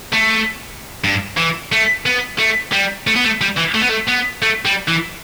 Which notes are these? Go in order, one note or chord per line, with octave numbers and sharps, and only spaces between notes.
A3
G2
E3
A3
B3
A3
G3
A3
B3
A3
G3
E3
A3
B3
A3
B3
A3
G3
E3